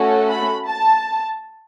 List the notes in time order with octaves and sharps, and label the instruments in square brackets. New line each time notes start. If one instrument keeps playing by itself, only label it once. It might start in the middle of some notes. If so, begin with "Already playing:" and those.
Already playing: [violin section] A3 C#4 F#4 A4
B5
A5